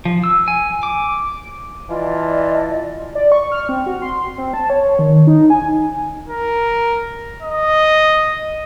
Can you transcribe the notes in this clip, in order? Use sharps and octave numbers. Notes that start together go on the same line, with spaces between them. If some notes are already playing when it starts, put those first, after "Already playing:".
F3
E6
G#5
D6
E3 F4 D5 D#5 A5
D5
C#6
F6
C4
F#4
C6
C4
A5
C#5
D#3
D#4
G#5
A#4
D#5